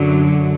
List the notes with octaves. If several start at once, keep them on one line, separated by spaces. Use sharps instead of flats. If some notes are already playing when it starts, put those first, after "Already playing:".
Already playing: F#2 D3 F#3